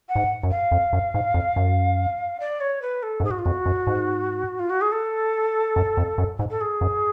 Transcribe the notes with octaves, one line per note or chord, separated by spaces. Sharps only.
F#5
G#2
F#2
F5
F2
F#2
G#2
F2
F#2
D5
C#5
B4
A4
F#2
G#2 G#4
F#4
F4
F2 F#4
F#2
G#2
F4
F#4
G#4
A4
F#2
F2
F#2
G#2
A4
G#4
F#2